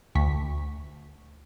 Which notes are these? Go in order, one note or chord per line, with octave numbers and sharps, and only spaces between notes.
D2 C#6 B6